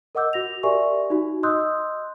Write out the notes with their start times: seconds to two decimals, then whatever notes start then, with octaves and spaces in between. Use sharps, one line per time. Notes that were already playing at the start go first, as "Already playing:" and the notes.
0.15 A#4 D#5 F#5 D6 E6 G6
0.33 F#4 A#6 F7
0.63 G4 A#4 D5 E5 G#5 C#6
1.10 D#4 F#4
1.43 D#5 C6 D#6 E6 F#6 G6